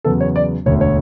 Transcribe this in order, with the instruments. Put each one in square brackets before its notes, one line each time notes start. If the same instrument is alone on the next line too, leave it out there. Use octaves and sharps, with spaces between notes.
[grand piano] E2 C#3 F#3 B3 A4
C#5
D5
E1 D2 D3 A3 C#5
C#5